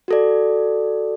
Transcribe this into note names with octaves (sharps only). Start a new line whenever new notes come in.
F#4 A4 D5